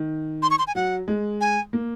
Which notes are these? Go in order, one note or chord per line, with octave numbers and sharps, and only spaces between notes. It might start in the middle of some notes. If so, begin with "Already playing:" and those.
Already playing: D#3
C6
C#6
C6
G#5
F#3 F#5
G#3
G#5
A#3